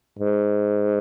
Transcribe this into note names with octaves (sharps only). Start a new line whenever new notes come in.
G#2